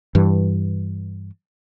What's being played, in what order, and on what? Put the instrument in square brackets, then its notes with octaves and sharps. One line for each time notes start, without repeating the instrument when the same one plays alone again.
[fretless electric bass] G2 E3